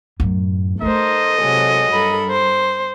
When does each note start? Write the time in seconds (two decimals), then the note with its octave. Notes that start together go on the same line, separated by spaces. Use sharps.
0.20 F#2 A2
0.82 A3 D#4 A4 A#4 C5 D#5
1.41 C3 F#3 G#3
1.92 G2 A4 A#4 B5
2.30 C5